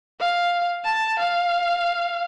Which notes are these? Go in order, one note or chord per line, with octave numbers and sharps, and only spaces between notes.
F5
A5
F5